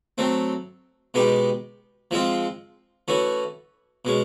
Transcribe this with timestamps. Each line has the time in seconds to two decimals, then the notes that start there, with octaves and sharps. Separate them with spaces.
0.18 F#3 A3 C4
1.14 B2 G#3 B3 D#4 G4
2.11 F3 G#3 C4 F4
3.08 E3 A3 C#4 F#4
4.05 B2 G#3 C#4